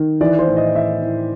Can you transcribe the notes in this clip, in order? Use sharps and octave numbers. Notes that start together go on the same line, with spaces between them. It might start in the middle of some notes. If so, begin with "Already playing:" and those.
Already playing: D#3
E3 D5
C5
A2
D#5
A2 E5
A2